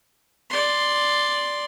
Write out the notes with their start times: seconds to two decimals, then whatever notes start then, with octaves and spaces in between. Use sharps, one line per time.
0.50 D5 C6